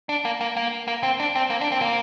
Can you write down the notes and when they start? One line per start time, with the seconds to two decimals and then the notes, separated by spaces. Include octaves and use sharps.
0.09 D4
0.25 A#3
0.41 A#3
0.57 A#3
0.88 A#3
1.03 C4
1.20 D4
1.35 C4
1.50 A#3
1.61 D4
1.72 C4
1.82 A#3